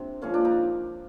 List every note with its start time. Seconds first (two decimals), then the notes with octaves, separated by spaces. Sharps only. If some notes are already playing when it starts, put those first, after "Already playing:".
Already playing: C3 C4 D4
0.22 A#2 F3 G#3 C#4
0.34 D4
0.45 D#4